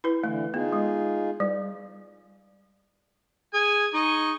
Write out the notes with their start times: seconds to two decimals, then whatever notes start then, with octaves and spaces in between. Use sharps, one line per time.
0.04 E4 B4
0.23 D3 E3 A3
0.54 B3 D#4 F4 G#4
0.72 G#3
1.40 G3
3.54 G#4 G#5
3.94 D#4 D#5 C#6